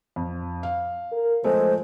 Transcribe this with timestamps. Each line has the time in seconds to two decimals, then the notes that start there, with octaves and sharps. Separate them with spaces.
0.16 F2
0.63 F5
1.12 A#4
1.44 F3 G#3 A3 C5